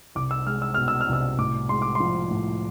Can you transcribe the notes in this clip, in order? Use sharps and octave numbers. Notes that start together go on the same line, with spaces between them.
C2 D6
E6
G#3 F6
E6
B2 F6
E6
F6
C2 E6
A2 D6
G#3 C6
D6
F3 C6
A2